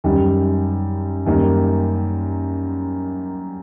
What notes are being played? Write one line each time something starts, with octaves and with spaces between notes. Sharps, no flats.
F#2 D#3 G3
F#2 D#3 G3 A#3